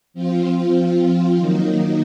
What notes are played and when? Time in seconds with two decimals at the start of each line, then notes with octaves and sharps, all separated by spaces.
0.14 F3 C4 F4
1.36 D#3 F#3 A#3 D#4